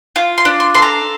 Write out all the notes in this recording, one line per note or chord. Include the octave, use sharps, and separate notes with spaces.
F4
C6
D4
C6
A4 C6
A#5